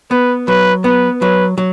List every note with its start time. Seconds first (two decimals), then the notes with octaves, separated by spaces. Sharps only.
0.11 B3 B4
0.48 F#3 B4
0.84 B3 B4
1.21 F#3 B4
1.58 F#3